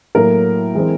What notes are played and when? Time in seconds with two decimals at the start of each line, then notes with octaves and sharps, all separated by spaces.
0.15 A2 F#3 A#3 A#4
0.75 E3 G#3 C4